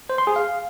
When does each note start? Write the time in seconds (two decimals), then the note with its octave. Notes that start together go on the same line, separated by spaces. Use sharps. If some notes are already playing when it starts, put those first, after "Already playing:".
0.10 C5
0.18 C6
0.27 G#4
0.36 F5